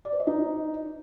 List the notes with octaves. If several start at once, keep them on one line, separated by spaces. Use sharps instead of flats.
D5
C5
D#5
D#4